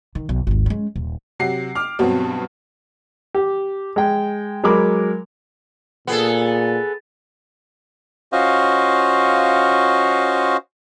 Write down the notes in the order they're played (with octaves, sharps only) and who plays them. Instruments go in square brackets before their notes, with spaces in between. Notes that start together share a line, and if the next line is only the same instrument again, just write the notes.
[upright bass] D#3
B1
G#1 D#2
G#3 C#4
D#1
[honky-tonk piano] C3 F#3 F#5 C7
D6 F6
G2 B2 F#3 B3 C4
[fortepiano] G4
G#3 G5
F#3 G#3 A#4 B5 D6
[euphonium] A#2 [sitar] B3 G#4 A4
[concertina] C#4 F4 F#4 C5 D#5 F5